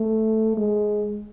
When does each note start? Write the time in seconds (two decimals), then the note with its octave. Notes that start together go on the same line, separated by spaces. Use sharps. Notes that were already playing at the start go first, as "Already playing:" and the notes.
Already playing: A3
0.57 G#3